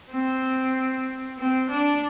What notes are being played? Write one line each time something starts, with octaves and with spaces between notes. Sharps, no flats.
C4
C4
D4